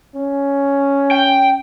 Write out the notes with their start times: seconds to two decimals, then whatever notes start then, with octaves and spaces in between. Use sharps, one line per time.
0.15 C#4
1.11 G5